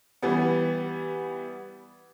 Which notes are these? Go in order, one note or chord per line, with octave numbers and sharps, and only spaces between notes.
E3 G3 B3